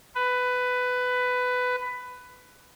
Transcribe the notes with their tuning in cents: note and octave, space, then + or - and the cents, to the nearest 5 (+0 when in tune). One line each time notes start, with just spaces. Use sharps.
B4 +15